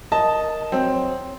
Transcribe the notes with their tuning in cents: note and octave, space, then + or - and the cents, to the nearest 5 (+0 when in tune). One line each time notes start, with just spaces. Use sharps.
A#4 +0 D#5 +0 A5 -10
F#3 +0 C4 +0